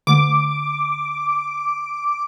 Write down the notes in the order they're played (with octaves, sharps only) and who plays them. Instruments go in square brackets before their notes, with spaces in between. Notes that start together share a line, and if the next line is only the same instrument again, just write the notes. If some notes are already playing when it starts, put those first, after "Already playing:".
[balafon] D3 A3 [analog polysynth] D6